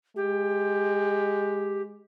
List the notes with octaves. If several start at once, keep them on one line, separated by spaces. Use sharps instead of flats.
G#3 G4